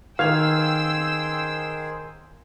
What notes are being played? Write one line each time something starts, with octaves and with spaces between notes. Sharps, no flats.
D#3 G#4 C5 F5 G5 E6 G#6 F7